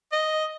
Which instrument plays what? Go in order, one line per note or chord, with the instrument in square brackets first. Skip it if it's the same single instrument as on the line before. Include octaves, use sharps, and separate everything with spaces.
[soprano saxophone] D#5